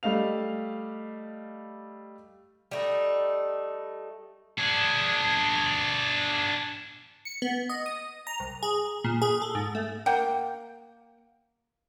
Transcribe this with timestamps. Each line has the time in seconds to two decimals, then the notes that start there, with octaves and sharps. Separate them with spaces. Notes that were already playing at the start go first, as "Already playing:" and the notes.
0.03 G3 A3 D#5 F5 F7
2.71 G3 A3 D#4
4.58 D4 G#4
7.25 C#7
7.42 B3
7.69 D#5
7.86 D#6
8.27 A#5
8.40 C2
8.63 G#4
9.04 A#2
9.22 G#4
9.42 A4
9.55 G#2
9.75 A3
10.06 A#3 F#5 G5